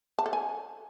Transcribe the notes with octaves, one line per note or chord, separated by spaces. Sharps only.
A5
A4
G#5